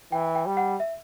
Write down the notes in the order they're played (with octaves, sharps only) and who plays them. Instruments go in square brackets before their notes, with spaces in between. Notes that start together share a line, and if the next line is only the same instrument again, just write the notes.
[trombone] E3 [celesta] G5
[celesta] G5
[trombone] G3
[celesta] F#5
E5